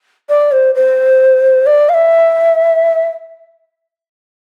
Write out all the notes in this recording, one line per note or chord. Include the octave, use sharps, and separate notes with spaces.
D5
C5
C5
D5
F5
E5